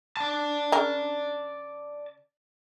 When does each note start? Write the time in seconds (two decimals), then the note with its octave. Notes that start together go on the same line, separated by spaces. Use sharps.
0.17 D5 A5
0.72 C#3 A#4